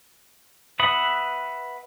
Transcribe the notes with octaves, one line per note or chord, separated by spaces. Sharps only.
B4 E5 F#5 B5 D#6